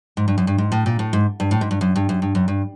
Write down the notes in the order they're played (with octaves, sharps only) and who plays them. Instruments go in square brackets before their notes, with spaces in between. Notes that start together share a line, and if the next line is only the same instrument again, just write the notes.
[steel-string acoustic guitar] G#2
G2
F#2
G2
G#2
A2
A#2
A2
G#2
G2
A2
G#2
G2
F#2
G2
F#2
G2
F#2
G2